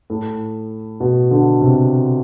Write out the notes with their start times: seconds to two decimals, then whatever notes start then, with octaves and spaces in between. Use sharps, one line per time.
0.10 A2
1.00 B2
1.31 D3
1.61 C3